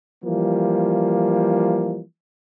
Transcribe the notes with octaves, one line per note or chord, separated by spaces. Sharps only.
E3 F3 G3 A#3